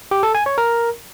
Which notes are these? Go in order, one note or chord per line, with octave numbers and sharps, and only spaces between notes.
G4
A4
G#5
C#5
A#4